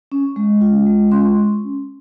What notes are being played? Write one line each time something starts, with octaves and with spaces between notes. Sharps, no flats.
C#4
G#3
F4
G#3
C#4 C6